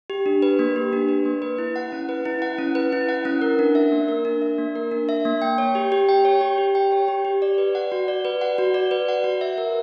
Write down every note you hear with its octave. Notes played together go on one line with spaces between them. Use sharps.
G4
D4
B4
A#3
G4
D4
B4
A#3
B4
E4
F#5
C#4
B4
E4
F#5
C#4
B4
E4
F#5
C#4
A#4
D4
E5
A#3
A#4
D4
E5
A#3
A#4
D4
E5
A#3
G5
C#5
G4
G4
G5
C#5
G4
G4
G5
C#5
G4
G4
D5
B4
F#5
F#4
D5
B4
F#5
F#4
D5
B4
F#5
F#4
E5
A#4